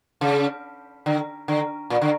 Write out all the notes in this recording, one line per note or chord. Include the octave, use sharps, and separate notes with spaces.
C#3
D3
D3
A#2
D3